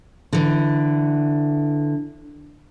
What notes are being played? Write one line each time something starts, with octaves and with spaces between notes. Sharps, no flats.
D3 E3